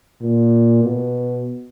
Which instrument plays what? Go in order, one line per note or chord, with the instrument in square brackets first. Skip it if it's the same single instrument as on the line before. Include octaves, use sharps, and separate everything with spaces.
[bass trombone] A#2
B2